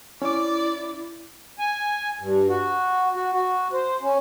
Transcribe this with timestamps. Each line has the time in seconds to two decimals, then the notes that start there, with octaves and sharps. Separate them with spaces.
0.22 C#4 E4 D5 D6
1.59 G#5
2.20 G2
2.49 F#4
3.15 F#4
3.32 F#4
3.73 C5
4.02 C#4